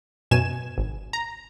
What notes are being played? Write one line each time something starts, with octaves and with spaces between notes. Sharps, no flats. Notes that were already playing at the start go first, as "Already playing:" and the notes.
F#2 B2 G#5 E7
G#1
A#5